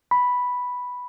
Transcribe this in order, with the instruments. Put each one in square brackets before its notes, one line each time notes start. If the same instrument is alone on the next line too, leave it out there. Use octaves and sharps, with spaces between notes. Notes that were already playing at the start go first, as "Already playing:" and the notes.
[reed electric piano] B5